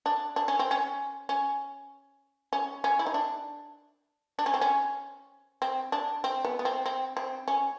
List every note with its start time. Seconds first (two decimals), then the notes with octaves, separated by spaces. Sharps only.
0.06 D4
0.36 D4
0.48 C#4
0.59 C4
0.71 C#4
1.29 C#4
2.53 C#4
2.84 C#4
2.99 E4
3.07 D#4
3.14 D4
4.39 D4
4.46 C#4
4.54 C4
4.61 C#4
5.62 C4
5.92 D4
6.24 C4
6.45 B3
6.59 B3
6.65 C4
6.86 C4
7.17 C4
7.48 C#4